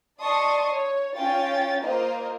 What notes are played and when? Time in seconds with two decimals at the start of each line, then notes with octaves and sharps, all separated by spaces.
0.21 D5 D#5 A5 C6 C#6 D#6
0.73 C#5
1.16 C#4 F4 G5 A6
1.83 A#3 F4 A#4 C5 D#5